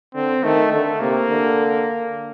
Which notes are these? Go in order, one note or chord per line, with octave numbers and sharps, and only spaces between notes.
D3 C4
D#3 A3
D3 A3
C3 A#3
D3